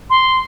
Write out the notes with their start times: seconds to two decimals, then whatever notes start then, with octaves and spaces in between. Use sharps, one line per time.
0.10 C6